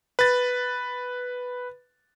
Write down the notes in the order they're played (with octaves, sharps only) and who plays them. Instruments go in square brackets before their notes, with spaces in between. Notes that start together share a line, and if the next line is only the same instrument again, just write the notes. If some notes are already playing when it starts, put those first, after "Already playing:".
[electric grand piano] B4 A6